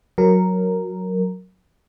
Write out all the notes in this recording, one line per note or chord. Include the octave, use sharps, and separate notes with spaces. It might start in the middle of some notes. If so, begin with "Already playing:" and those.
F#3 A#4